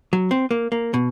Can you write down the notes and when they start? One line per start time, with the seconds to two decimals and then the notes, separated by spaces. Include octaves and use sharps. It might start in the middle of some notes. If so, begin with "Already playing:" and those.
0.13 F#3
0.31 C4
0.51 A#3
0.72 A#3
0.94 B2